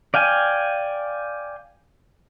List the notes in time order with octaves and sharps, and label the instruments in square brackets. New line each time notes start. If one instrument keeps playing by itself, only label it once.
[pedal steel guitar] D5 F5 G5 G#5